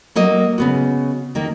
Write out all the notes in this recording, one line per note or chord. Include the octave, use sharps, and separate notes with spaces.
F#3 A#3 D#5
C#3 B3 F#4
D#3 A#3